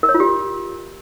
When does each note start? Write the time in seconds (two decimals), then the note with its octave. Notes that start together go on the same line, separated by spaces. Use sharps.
0.03 A#4
0.09 C#5
0.14 F4
0.20 G4